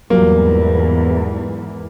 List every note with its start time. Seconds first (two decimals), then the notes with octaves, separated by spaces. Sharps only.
0.10 E2 G#2 E3 F#3 G3 A#3 F4